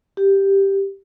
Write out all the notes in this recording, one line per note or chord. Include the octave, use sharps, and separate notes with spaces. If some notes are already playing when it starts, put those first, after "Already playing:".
G4